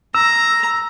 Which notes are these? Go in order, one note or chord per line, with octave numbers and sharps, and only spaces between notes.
A#5 E6